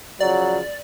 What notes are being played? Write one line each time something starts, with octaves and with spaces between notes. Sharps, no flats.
C#3 F3 F#3 D5